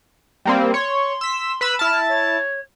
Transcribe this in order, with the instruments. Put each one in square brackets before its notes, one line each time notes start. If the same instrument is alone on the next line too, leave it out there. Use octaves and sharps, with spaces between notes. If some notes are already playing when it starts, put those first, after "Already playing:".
[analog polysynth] G3 A#3 C4
[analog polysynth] C#5 [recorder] C6
[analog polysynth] E6 B6
B4 B5 E6
[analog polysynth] E4 A5 [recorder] F6
[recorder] C#5